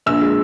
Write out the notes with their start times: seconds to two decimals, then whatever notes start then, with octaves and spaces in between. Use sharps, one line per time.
0.06 A#1 E6
0.22 G#3